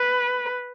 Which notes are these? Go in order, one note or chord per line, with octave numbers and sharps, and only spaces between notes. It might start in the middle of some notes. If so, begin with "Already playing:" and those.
Already playing: B4